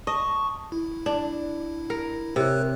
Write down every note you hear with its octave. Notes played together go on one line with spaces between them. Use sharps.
D#5 A5 C#6
E4
D4
A#4
C3 A#4 C#5 F#6